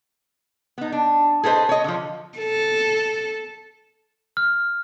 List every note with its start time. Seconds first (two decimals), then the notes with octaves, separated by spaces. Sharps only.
0.78 B3 D#4
0.92 D4
1.44 G#4 A4 B4 C5 D#5
1.69 C#5 D#5
1.84 D3 F3
2.38 A4
4.37 F6